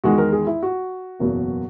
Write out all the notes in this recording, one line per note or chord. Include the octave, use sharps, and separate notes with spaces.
E2 D#3 G#3 F#4
A#4
G#4
E4
F#4
F#1 E2 B2 F#3 A#3